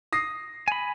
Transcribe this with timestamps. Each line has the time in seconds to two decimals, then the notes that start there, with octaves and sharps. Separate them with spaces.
0.13 D#6 A#6 C7
0.68 G#5 B5